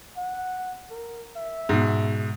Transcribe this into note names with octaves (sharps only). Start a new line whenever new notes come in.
F#5
A#4
E5
G#2 B2